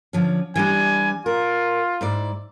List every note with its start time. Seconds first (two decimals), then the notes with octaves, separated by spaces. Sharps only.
0.13 D3 F3 C#4
0.56 E3 G3 D4 G#5
1.26 F4 A#4
2.01 G#2 E4 D5